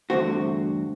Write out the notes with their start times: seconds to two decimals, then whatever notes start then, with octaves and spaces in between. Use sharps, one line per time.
0.10 E2 G2 D3 A3 C4 F#4